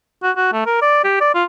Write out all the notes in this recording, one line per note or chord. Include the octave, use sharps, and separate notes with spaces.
F#4
F#4
A3
A#4
D5
G4
D5
F4